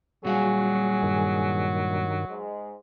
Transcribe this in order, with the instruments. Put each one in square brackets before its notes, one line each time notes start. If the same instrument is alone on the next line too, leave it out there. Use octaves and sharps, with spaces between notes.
[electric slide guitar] A#2 G3 F5 [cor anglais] F#3 [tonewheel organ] F#4 [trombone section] G#4
[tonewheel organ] G2 D#3
[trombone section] G#2 G#3